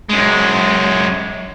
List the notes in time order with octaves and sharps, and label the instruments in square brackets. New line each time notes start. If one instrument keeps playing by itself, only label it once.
[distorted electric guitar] F#2 G#3